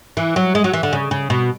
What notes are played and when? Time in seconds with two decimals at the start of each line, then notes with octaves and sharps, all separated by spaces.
0.17 E3
0.36 F#3
0.55 G#3
0.64 F#3
0.73 E3
0.83 D3
0.93 C#3
1.11 C#3
1.30 B2